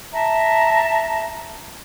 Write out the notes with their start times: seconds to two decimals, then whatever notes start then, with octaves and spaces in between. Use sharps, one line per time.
0.13 E5 A5 A#5